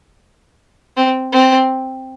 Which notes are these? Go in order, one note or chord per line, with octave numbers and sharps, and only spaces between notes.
C4
C4